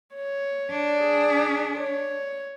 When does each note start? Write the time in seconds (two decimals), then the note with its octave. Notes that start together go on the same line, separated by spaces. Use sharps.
0.15 C#5
0.70 D4
1.01 G#4
1.78 C#5